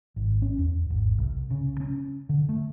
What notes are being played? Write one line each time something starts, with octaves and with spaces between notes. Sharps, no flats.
G#1
C#4
E2
G#1
C2
C#3
C#4
D3
A3